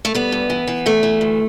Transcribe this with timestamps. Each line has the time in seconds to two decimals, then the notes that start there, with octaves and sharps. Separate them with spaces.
0.05 A3
0.14 G3 B3
0.32 G2
0.50 E3
0.67 E3
0.86 E2 A3
1.03 E3
1.21 D2